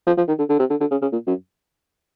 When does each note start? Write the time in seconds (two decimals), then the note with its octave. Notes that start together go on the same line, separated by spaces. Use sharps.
0.07 F3
0.18 F3
0.28 D#3
0.39 D3
0.49 D3
0.59 C3
0.70 D3
0.80 D3
0.91 C#3
1.02 C#3
1.12 A#2
1.27 F#2